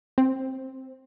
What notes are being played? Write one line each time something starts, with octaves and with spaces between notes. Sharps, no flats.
C4